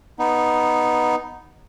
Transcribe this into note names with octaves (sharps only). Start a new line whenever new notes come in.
B3 D#4